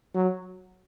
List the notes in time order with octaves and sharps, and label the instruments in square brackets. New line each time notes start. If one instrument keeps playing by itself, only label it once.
[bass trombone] F#3